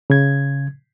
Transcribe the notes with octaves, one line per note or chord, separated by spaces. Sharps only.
C#3 G#6